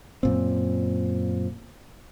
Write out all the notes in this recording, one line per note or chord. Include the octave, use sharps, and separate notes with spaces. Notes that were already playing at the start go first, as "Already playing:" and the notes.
F#2 A#2 C4